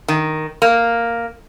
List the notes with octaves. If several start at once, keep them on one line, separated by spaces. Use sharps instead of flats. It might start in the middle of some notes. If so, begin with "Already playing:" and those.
D#3
A#3